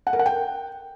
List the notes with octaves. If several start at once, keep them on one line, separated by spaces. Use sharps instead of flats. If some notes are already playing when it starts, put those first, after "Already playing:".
F#5
A#4
F#5
G5